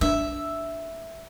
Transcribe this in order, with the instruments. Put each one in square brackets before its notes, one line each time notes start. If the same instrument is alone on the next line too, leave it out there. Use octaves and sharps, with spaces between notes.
[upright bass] D4 [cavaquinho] E5